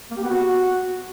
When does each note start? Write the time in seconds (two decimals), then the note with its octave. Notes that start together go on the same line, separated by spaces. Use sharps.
0.11 A#3
0.17 G4
0.24 B3
0.30 F#4